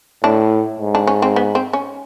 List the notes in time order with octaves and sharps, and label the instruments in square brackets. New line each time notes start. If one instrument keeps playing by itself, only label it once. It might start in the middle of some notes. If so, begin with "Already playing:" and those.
[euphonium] A2 [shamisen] D4
[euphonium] G#2
[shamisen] D4
C#4
C4
B3
C4
C#4